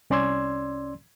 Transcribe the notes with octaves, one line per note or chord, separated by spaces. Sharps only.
C2 C#4 D5 C6 E6 G#6